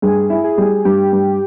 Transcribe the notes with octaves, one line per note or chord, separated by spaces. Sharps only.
G2 G#4
E4
G#4
G3
G2 G4
G2